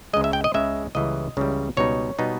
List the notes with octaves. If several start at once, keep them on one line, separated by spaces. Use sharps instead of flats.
C#2 C#3 G#3 D#5
E5
G5
D#5
C#2 C#3 G#3 E5
C#2 C#3 E3 G3 D#5
C#2 C#3 E3 G3
C#2 B2 G3 B3 D#4 C#5
B2 G3 B3 D#4